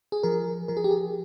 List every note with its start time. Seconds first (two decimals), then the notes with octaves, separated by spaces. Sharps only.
0.12 G#4
0.23 F3 A#4
0.68 F3 A#4
0.77 G#4
0.84 G4
0.91 G#4